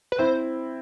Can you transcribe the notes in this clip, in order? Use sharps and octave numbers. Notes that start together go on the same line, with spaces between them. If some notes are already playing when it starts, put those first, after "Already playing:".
B4
C4 E4 C5